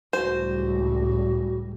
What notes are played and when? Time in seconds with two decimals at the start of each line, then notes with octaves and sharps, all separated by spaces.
0.13 C#2 A2 G3 F#4 C5